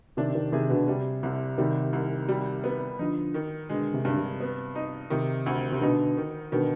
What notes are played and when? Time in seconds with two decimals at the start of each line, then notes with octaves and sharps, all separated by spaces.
0.17 C3 D#3 D4
0.34 C3 D#3
0.52 C3 D#3 G#4
0.70 B2 D3
0.87 C3 G3
1.23 C2 C3
1.58 C3 D#3 G3
1.93 C2
2.28 G3
2.64 B3
2.99 D3 F3 D#4
3.34 D#3
3.69 B2 D3 G#3
3.93 C3
4.05 G2 D3
4.17 C3
4.40 B3
4.75 D#4
5.10 C3 D#3
5.46 D2
5.72 C3
5.81 B2 D3 D#4
6.17 D#3
6.52 B2 D3 D#3